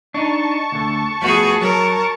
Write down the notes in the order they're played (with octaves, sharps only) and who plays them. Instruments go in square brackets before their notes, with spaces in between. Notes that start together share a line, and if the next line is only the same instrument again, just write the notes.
[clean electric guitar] D4 D#4 [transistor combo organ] A5 C#6
[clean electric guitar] D2 D3
[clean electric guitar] F3 A3 B3 [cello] F#4 G#4
[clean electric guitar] F#3 [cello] A#4